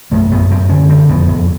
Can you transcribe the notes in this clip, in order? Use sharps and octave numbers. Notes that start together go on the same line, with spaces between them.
F#2 A3
F#2 B3
F#2 C4
D3 C#4
D3 C4
F2 B3
F2